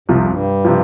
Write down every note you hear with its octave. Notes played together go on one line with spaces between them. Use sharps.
C2 G2 C3 F3
F2
G2
C3 F3